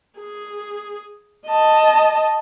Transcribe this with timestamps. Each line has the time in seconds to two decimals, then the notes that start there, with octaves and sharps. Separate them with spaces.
0.19 G#4
1.47 D#5 A5